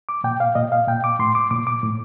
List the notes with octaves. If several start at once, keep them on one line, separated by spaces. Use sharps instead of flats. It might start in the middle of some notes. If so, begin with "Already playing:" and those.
D6
A#2 G5
F5
A#2 D#5
F5
A#2 G5
D6
A2 C6
D6
A#2 D6
D6
A2